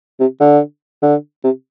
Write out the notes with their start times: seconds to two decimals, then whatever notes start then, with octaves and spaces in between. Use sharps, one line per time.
0.20 C3
0.40 D3
1.02 D3
1.44 C3